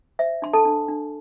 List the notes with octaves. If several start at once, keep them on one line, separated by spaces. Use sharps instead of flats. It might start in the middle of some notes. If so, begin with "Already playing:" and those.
C5 E5
D4 C6
A4 A5
D4
D4